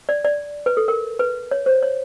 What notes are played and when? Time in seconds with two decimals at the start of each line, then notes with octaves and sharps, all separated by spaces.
0.09 D5
0.25 D5
0.66 B4
0.77 A4
0.88 A#4
1.19 B4
1.51 C#5
1.66 C5
1.83 C#5